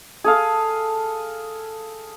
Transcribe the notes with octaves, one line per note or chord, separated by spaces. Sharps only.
G#4 A4 F5